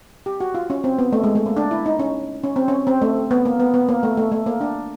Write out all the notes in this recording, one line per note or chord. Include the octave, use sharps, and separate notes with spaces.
G4
F#4
F4
C#4
C4
B3
A3
G#3
A3
A#3
D4
E4
D#4
C#4
C#4
C4
C#4
C4
A3
B3
A#3
B3
B3
A#3
A3
A3
A3
A#3
D4